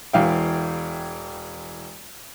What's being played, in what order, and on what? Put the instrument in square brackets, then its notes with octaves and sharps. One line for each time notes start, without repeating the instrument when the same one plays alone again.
[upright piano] E1 E3 F5 G5